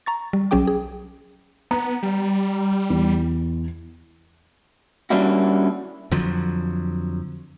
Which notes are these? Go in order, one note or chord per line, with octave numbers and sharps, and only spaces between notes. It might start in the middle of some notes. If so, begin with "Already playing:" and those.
A#5 C#6 A6
G3
B1 F#3 C#4 G#4 G5 D6
G#4
B3 A#5
G3
E2
G3 A#3 C#4 D4 E4 F#4
F2 D3 F3 F#3